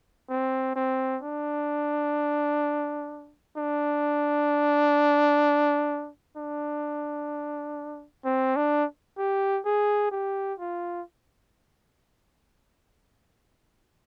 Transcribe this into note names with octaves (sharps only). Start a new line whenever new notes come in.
C4
C4
D4
D4
D4
C4
D4
G4
G#4
G4
F4